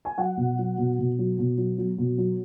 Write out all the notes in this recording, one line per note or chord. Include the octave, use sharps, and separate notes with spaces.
G#5
F#3 F#5
B2
F#3
B2
B2
F#3
B2
F#3
F#3
B2
F#3